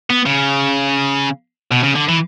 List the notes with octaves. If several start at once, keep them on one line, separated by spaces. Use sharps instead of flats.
B3
C#3
B2
C#3
D3
E3